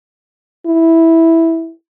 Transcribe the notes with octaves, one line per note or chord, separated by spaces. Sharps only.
E4